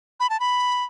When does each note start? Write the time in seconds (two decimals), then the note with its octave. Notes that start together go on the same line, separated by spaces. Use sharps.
0.20 B5
0.30 A5
0.40 B5